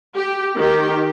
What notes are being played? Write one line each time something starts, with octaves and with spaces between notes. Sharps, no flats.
G4
D#3 G4